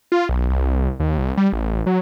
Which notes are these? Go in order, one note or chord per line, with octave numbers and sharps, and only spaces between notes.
F4
B1
C2
D#2
C2
G3
A1
F#3